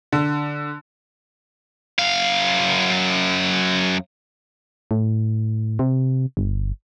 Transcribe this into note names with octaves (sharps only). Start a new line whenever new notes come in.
D3
F#2 F5
A2
C3
G1